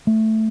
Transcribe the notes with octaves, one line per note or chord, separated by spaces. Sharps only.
A3